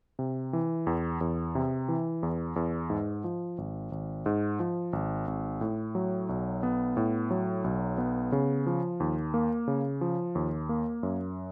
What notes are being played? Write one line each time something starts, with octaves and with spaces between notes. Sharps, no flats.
C3
E3
E2
E2
C3
E3
E2
E2
G#2
F3
G#1
G#1
G#2
F3
G#1
G#1
A2
F#3
B1
B3
A2
F#3
B1
B3
C#3
F3
D#2
A#3
C#3
F3
D#2
A#3
F#2